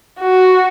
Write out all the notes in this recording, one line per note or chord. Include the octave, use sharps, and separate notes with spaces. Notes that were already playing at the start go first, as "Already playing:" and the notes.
F#4